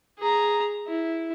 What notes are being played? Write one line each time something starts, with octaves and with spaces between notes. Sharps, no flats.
G#4 A#5
E4